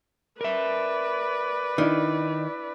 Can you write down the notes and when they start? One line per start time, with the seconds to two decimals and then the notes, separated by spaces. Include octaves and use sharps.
0.41 A#4 B4 D5 E5
1.78 D#3 D4 E4